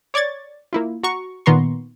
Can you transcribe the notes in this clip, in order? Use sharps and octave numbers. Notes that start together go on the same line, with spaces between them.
C#5 D5 C#6 G#6 A6
A#3 E4 F4
F#4 A#5 C#6
A#2 D#3 B3 A#5 C6 C#6